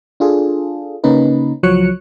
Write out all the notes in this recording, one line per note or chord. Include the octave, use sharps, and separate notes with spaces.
D4 F4 G#4 A4
C#3 A#3 C#4 D#4 B4
C#2 F3 F#3 C#5 F#6 C#7